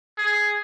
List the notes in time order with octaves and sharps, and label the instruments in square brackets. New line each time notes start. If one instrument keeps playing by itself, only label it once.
[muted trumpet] G#4